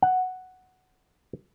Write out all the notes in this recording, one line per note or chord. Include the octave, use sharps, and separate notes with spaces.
F#5